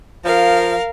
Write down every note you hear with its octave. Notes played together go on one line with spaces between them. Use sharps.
F3 A#4 F5